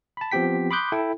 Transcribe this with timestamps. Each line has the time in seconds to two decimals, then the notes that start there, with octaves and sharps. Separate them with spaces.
0.17 A5 B5
0.31 F3 B3 C4 G4 G5 B6
0.71 B5 C6 D6 D#6 F#6 G6
0.92 E4 A4 G5